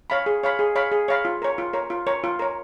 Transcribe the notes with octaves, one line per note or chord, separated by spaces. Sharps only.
C#5 F5 B5
G#4
C#5 F5 B5
G#4
C#5 F5 B5
G#4
C#5 F5 B5
F4
A#4 C#5
F4
A#4 C#5
F4
A#4 C#5
F4
A#4 C#5